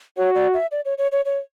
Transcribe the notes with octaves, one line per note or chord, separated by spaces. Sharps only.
F#4 C#5
D5
E5
D5
C#5
C#5
C#5
C#5